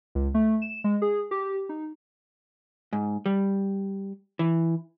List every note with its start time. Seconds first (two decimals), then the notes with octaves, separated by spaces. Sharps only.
0.15 C#2
0.34 A3
0.62 E7
0.84 G#3
1.02 G#4
1.31 G4
1.69 D#4
2.93 G#2
3.26 G3
4.39 E3